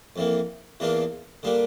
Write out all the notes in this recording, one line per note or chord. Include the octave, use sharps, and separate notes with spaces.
F2 E3 A#3
E2 E3 A#3 D4 F4
D3 G3 A#3 D4